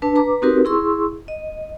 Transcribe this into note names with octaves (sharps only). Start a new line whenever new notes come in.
D4 B4 A5
B4 A#5 D6
C4 D#4 F#4 G4 A#4 B4
E4 G#4 C6 C#6 E6
D#5